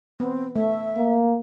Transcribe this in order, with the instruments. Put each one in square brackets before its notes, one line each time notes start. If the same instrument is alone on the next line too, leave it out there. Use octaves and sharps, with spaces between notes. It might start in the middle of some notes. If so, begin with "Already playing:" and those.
[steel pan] B3 [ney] C4
[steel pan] A3 [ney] E5
[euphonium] A#3